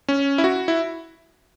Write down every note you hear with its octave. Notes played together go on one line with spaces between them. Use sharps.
C#4
E4
F#4
E4